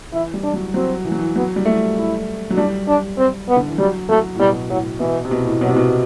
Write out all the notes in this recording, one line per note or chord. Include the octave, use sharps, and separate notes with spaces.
E3 E4
G3
D4
F#3
F#3 C4
E3
F#3
E3
F#3 B3
G3
A3
E4
F#3
G3 D4
D4
C4
B3
D3
E3
F#3 G3
F#3 A3
A2
B2 G3
A2 F#3
B2 E3
C3
B2
A2
B2 F#3
C3
B2